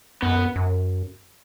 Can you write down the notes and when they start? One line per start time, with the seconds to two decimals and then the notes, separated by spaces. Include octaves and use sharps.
0.22 F#2 B3
0.56 F#2